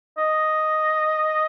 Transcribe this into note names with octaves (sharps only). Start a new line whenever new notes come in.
D#5